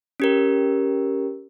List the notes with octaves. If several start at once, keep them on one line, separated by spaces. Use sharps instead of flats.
C#4 G4 A#4